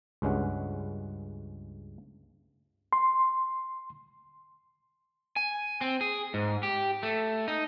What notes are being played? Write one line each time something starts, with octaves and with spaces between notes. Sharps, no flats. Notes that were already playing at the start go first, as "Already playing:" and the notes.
C#2 G2 G#3 C#4 F#5
C6
G#5
C4
G#4
G#2
G4
A3
D#4